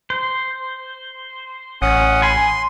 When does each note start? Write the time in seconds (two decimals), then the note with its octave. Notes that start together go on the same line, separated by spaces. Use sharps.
0.10 C5
1.82 A1 C#4 F#5 D#6
2.22 G#5 B5 C6